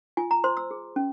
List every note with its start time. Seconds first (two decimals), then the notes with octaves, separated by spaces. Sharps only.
0.17 F4 G#5
0.31 A#5
0.44 C5 C6
0.57 E6
0.71 G#4
0.96 C#4